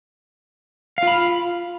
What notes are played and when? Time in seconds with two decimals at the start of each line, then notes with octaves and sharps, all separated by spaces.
0.98 F5
1.03 F4
1.07 B5